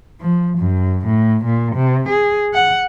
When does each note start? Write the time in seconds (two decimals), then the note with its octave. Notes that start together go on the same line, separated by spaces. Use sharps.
0.21 F3
0.58 F#2
1.06 A2
1.44 A#2
1.75 C3
2.09 G#4
2.54 F#5